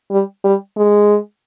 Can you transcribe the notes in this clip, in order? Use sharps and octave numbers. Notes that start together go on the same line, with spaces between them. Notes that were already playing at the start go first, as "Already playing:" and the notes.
G3
G3
G#3